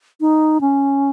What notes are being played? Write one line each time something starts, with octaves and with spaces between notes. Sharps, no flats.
D#4
C#4